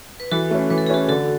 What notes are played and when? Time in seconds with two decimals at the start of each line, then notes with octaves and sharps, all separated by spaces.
0.20 B4
0.32 E3 F#4 A4
0.51 A3 C#4
0.70 E3 B4
0.78 A4
0.86 G#4
0.90 A3 C#4 F#4 A4
1.09 D3 F#4 A4